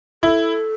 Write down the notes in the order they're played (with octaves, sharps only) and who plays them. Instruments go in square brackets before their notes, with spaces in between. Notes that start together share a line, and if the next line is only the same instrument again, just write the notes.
[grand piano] E4 [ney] A4